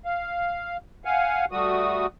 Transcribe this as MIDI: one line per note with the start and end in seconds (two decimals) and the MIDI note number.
0.05 0.77 77
1.05 1.45 77
1.05 1.45 78
1.05 1.45 80
1.52 2.06 55
1.52 2.06 57
1.52 2.06 66
1.52 2.06 87